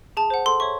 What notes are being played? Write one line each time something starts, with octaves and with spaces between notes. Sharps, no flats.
G#4 A5
C5 F#5
A4 C6
C#5 E5 C#6